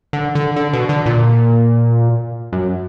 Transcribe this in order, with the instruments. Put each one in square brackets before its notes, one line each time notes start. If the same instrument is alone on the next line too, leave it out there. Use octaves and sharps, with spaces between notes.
[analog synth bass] D3
D3
D3
B2
D3
A#2
F#2